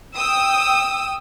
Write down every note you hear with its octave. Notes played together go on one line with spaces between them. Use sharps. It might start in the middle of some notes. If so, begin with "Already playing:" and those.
G5 D#6 E6